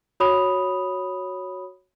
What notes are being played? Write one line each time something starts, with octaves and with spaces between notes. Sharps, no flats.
F#4 C#5 B5 D#6 F7